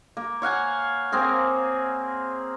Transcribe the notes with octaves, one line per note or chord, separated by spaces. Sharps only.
A#3
C#5 F5 F#5 G#5
A#3 C4 G#4 A#4